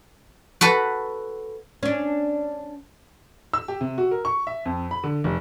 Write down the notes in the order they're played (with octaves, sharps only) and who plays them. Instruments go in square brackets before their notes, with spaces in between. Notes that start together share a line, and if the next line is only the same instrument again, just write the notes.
[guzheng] F#4 A4 B4
[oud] C#4 D4
[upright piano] E6
G4
C3
F#4
A#4
C#6
E5
F2
B5
D3
F1